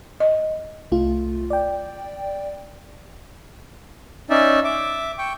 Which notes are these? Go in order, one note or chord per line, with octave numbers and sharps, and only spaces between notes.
D#5
C2 A3 F4
D5 G5
C#4 D#4 D5 E5
E5 D6
G5 C#6